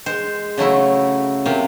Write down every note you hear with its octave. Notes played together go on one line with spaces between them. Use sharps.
G#3 C5
C#3 F#3 A3 E4
C3 A#3 F4